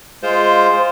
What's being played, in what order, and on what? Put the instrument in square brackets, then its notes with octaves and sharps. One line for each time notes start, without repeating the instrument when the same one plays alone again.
[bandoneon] G#3 F4 C5